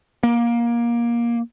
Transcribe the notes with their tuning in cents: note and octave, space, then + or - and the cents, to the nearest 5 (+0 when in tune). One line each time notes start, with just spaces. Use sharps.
A#3 +20